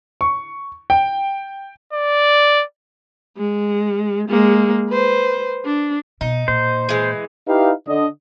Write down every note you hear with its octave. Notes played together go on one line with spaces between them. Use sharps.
C#6
G5
D5
G#3
G#3 A#3
B4 C5
D4
B2 D#4
A#2 C5
E3 G#3
D#4 E4 G4 B4 F5
D3 D4 D#5